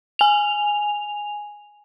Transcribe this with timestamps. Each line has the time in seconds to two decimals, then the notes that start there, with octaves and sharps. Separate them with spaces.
0.19 G#5 F7